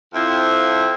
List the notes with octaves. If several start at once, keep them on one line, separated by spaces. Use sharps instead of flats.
F2 F3 C4 E4